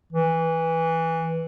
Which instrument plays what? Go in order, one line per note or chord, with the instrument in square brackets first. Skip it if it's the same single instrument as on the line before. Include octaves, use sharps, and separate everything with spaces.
[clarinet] E3